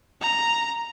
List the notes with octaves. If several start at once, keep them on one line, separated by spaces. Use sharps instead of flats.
A#5